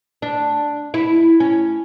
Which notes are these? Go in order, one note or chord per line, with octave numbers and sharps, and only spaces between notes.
D4
E4
C#4